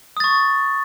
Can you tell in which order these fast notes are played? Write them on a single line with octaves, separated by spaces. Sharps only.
D#6 A6 C#6